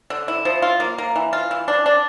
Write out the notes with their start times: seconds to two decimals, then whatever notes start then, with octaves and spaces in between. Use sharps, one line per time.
0.10 D3
0.28 E4
0.45 F3
0.62 F4
0.80 A#3
0.98 A#3
1.16 E3
1.33 F4
1.51 E3
1.68 D4
1.86 D4